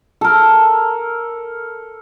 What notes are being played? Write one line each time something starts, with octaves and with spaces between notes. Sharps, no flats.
A4 A#4